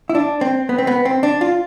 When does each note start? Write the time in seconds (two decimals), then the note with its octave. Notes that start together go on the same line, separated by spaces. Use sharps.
0.09 E4
0.15 D4
0.41 C4
0.69 B3
0.78 C4
0.87 B3
1.05 C4
1.23 D4
1.41 F4